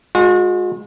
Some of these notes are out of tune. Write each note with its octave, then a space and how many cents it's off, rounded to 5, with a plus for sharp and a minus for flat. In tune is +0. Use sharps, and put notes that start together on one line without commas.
G#3 +0 F#4 -40